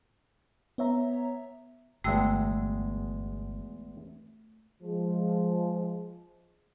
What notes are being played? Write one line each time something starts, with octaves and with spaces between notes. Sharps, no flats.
B3 C#5 E5 A#5
G1 E2 G#3 A3 F#4 G5 E6
F3 G#3